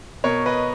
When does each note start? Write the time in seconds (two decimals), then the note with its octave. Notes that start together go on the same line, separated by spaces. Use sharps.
0.24 B2 A#4 C#5
0.46 B4 D#5